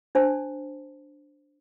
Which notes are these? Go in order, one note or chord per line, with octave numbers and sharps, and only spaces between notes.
D4 C5 A5